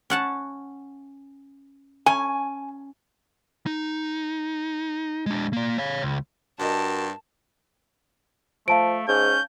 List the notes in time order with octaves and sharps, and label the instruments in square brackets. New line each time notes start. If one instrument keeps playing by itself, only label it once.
[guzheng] C#4 F#5 A5
[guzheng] C#4 [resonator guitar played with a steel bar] G#5
[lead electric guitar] D#4
G#3 D4
A#3 D5
C#5 F5
C#2
[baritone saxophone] G2 [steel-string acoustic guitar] F#4 A#4 D#5 [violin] A5
[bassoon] F3 [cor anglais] A3 [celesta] F5 A5 D7
[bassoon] G#2 [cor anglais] C#4 [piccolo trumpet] G6